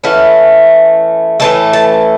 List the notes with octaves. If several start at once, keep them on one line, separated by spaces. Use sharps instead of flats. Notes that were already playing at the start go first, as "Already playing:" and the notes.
E3 A3 C#4 E4 F#5
A2 E3 A3 A5
A5